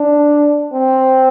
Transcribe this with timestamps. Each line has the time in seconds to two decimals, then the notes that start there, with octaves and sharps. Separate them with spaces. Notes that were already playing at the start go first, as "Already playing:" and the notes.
Already playing: D4
0.73 C4